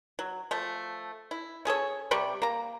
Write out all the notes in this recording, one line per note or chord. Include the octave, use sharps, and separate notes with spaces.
F#3
F3 A3
E4
C#4 G#4 A4 C#5
C3 G3 D5 C#6
A#3 A#5